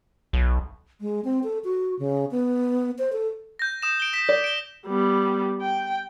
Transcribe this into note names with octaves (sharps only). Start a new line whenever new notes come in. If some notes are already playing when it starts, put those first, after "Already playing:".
B1
G#3
C4
A4
F#4
C#3
B3
C5
A4
G6 A#6
D#6 E7
D7 G7
D#6 B6 E7
D5
D7 G7
G3 B3
G5